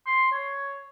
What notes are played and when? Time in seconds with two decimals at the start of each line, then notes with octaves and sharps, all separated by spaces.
0.06 C6
0.32 C#5